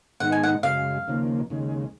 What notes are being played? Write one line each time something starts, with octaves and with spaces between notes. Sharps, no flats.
G#2 D#3 G#3 B3 D#4 F#5
G#5
F#5
F#2 C#3 G#3 F5
D#2 C#3 F3 A#3
D#2 C#3 G#3